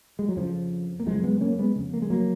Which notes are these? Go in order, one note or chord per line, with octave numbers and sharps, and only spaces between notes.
G#3
F#3
F2 C#3 F3
A#3
F#2 C#3 F3 G#3
G#3 B3
A#3 C#4
G#3 B3
F2 C#3
A#3
G#3
F#3 A#3